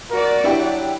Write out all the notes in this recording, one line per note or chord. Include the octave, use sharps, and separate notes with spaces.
F#4 A#4 D5
F#3 D4 E4 G4